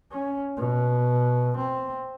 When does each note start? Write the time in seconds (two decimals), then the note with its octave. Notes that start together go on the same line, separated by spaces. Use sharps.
0.12 C#4
0.57 B2
1.58 C4